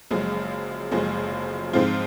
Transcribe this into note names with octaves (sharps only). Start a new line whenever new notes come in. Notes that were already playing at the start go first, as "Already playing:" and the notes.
F#1 F#2 F3 G#3
F#1 F#2 F3 G#3
G#2 F3 C4 F4